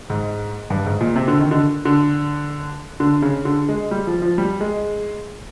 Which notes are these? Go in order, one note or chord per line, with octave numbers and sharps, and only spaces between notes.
G#2
G2
G#2
A#2
C3
D3
D#3
D3
D3
D3
C#3
D3
G#3
G3
F3
F3
G3
G#3